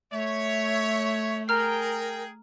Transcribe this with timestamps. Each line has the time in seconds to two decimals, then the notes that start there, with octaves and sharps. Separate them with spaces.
0.12 A3 C#5 E5
1.48 G#4 A#4 G5 A#5 F6 C7